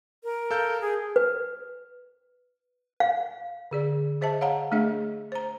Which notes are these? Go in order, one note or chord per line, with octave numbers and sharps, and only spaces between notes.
A#4
A4 F5 G6
G#4
B4
F5
D3 G#4 D5
G#4 C5 D#5 E5 A5
C#5 F5 F#5 A#5
A3 D4 G#4 D#5 E5
C5 A#5